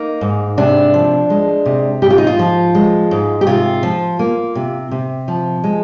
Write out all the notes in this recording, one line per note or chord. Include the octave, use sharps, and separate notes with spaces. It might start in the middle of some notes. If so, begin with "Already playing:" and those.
Already playing: A#3 D#4
G#2
C3 D4
F3
G#3
C3
G#2 G4
F4
D#4
F4
F3
G#3
G#2
G4
C3 F4
F3
A#3
C3
C3
F3
G#3